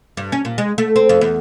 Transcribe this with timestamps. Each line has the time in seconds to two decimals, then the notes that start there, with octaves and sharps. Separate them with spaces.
0.17 G2
0.32 C#4
0.45 A#2
0.58 G#3
0.78 A3
0.96 C4
1.09 F2
1.21 E2